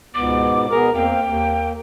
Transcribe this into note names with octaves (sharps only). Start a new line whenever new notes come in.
C#2 G#2 B2 B3 D6
B2 B3 G#4 A#4
E2 A#3 C4 F5 G5
D#2 A#3